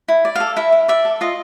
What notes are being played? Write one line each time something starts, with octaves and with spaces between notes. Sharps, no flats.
E4
D5
A4 F5
E4 E5
E4
D5 E5
A4
F4 D#5